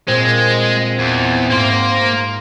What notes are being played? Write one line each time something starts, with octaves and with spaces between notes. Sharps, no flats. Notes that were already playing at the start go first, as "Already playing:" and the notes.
A#2 G#3 C4
E2
G#2 A#3 C6